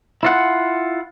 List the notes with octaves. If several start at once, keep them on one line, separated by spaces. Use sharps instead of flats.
E4 F4 F#5